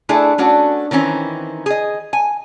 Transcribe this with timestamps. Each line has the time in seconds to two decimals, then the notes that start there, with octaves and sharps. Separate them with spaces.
0.09 A3 D4 E4 G#4 A4
0.38 A3 C#4 D4 F#4
0.91 D#3 E3 C4 C#4
1.66 G#4 D#5
2.13 G#5